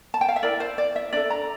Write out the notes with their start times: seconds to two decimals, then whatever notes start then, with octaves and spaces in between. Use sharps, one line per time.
0.14 A5
0.21 G5
0.29 F5
0.36 E5
0.43 E4 A#4 D5
0.60 C5
0.78 D5
0.96 E5
1.13 D4 A4 D5
1.30 A#5